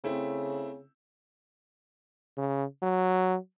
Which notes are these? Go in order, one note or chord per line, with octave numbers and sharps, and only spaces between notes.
C#3 A3 C4 E4
C#3
F#3